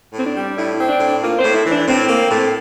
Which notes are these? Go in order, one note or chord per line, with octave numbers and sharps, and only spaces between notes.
A2 C4
D4
G3
A2 E4
E4
C4
D4
A2
D4
A#3 F4
C5
A2
E4
E3
D4
A2 C4
A#3
A2